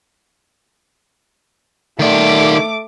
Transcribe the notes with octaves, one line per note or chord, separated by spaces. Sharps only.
D#3 A3 D5 D6